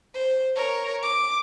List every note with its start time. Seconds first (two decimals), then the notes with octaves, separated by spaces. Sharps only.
0.15 C5
0.56 A#4 C#5
1.03 D6